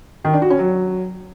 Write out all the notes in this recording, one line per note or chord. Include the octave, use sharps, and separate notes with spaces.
D#3
D4
F#4
C#4
F#3